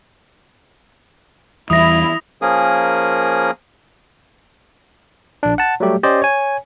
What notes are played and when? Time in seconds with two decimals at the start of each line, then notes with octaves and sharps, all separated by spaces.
1.70 E2 E3 G3 E4 D#6 A#6
2.42 F3 A#3 C#4 G#4 A#4 D#6
5.43 A#1 D4
5.58 F#5 A5
5.80 F#3 G3 A3 G4
6.03 C#4 G4 C5 D5 D#5
6.22 C#5 G#5